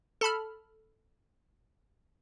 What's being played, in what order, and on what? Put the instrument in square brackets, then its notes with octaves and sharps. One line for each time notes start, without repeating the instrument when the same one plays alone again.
[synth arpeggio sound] A4 A5 B5 F6